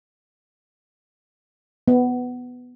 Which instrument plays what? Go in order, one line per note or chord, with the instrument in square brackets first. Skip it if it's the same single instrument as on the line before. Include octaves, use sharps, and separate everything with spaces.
[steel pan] B3